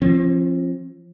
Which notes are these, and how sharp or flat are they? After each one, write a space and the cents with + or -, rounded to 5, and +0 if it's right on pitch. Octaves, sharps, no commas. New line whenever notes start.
F3 -20 C4 +40